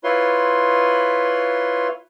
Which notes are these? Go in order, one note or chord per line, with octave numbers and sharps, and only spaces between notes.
E4 F4 B4 C#5 C6